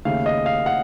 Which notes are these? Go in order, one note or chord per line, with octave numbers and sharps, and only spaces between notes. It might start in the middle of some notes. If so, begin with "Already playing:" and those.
D#2 C#3 A3 F5
D#5
F5
F#5